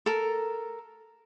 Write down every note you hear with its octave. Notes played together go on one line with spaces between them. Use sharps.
A4 A#4